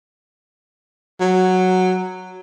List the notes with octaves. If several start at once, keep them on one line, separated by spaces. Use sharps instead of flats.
F#3